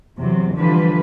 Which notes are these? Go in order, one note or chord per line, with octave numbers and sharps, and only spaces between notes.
E2 C3 F#3
D3 E3 F3 G3 F4 B4